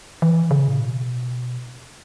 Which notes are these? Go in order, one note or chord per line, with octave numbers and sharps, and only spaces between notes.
E3
C#3
A2
B2